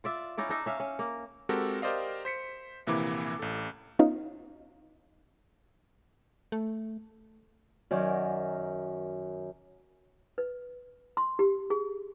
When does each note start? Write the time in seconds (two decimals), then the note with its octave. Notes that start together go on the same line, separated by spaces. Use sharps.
0.04 F4 D5 E5
0.38 C#4 D#4 E4 D5
0.49 D4 D#4 E5
0.66 C#4 E5 F5
0.80 C#4
0.99 A#3
1.49 G#3 C4 F#4 G4 A4 A#4
1.82 G4 A#4 C5 D5 D#5 F5
2.25 C5 B6 C#7
2.87 A#1 C3 E3 A#3 E4 D6
3.39 A1 A4
3.99 B3 C#4 D#4 F4
6.52 A3
7.91 F#2 D#3 F#4 D5 G#5
10.38 B4
11.17 C6
11.39 G4
11.70 G#4